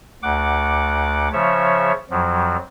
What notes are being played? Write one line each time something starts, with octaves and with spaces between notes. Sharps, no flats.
D2 F#5 D6
C#3 F3 C#5 E5
F2 F3 F#3